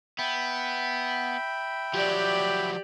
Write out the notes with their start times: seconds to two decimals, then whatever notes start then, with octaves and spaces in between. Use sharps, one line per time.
0.19 B3 E5 G5 B5
1.94 F3 F#3 G4 D5